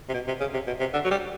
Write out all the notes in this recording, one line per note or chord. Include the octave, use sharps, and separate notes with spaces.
C3
B2
C3
C#3
C3
B2
C3
D3
F#3
G3